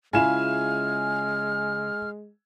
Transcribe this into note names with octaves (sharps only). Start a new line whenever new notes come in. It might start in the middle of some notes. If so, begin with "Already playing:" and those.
C#3 G#3 E4 F4 G#5 F6 E7